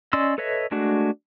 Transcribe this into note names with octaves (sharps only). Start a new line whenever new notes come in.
C#4 D5 D#5 C6 E6
A4 B4 C#5 D#5 E5
G#3 A3 D4 F#4